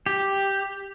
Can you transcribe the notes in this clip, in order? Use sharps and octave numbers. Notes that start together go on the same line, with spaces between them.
G4